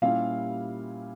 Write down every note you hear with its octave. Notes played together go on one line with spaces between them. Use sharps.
A#2 G3 C#4 E4 F4 G4 F5